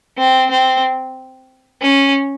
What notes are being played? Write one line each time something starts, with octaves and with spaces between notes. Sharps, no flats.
C4
C4
C#4